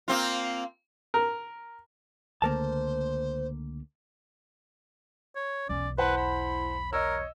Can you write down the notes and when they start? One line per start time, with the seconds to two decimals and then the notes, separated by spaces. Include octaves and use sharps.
0.08 A#3 C4 F4
1.14 A#4
2.42 C#2 D3 A3 A#3 A#4 C5 A5
5.36 C#5
5.69 B1 E2 C#4 D5
5.98 E4 B4 C5 F#5 A5
6.17 B5
6.93 A#4 C#5 D#5 E6